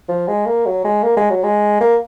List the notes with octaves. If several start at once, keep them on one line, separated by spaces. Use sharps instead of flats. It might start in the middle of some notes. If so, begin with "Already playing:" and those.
F3
G#3
A#3
F#3
G#3
A#3
G#3
F#3
G#3
A#3